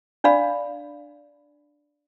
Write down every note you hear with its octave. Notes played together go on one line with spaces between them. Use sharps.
D4 D5 F5 B5